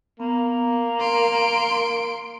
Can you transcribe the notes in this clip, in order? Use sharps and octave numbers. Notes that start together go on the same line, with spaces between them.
A#3 B3
A#4 C6 D7